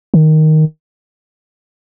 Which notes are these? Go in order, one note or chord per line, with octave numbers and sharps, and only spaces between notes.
D#3